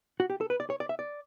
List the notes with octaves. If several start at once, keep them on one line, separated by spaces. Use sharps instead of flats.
F#4
G4
A4
B4
D5
C#5
D5
E5
D5